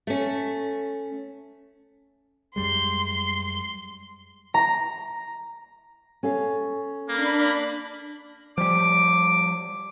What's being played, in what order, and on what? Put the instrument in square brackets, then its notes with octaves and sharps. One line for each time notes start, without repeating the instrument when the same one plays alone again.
[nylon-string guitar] A3 C#4
[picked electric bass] F#2 G3 G#3 [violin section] C6
[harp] A#5
[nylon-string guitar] C#4 A4 F5
[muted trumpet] A#3 [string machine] D4 B5
[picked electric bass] F3 G3 [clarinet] D6